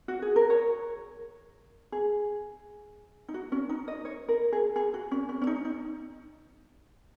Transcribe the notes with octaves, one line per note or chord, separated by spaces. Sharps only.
F#4
G#4
A#4
C#5
G#4
D#4
F#4
C#4
D#4
D#5
C#5
A#4
G#4
G#4
F#4
C#4
C#4
C#4
D#4
D#4